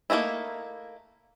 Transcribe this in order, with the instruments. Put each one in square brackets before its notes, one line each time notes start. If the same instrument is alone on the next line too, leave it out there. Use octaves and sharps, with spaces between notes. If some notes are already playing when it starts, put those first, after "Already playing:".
[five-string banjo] A3 A#3 C#4 D#4 E4